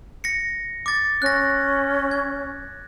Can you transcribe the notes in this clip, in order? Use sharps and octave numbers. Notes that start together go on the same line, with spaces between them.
A#6 C#7
D6 A6
C#4 F#6 A#6
G#6